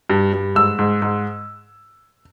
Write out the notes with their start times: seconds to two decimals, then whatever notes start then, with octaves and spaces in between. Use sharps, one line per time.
0.10 G2
0.33 G2
0.55 G#2 E6
0.79 G#2
1.02 G#2